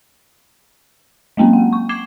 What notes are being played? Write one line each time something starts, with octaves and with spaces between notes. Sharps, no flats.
F#3 G#3 A#3 C4 C#4
F#5
C#6
D6 G#6 C7 E7 G7